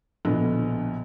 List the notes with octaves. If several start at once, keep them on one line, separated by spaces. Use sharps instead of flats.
A#1 B2 D3